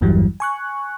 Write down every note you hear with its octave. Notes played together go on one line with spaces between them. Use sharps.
G#1 E2 G2 E3 F#3 G3
G#5 C#6 F#6